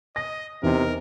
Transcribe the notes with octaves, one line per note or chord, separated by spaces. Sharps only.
D#5 A#6
E2 C3 D#4 A#4